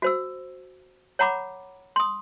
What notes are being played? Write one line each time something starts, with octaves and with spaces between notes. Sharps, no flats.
F#4 C5 E6
C#5 F#5 A#5 B5 D6
C6 D#6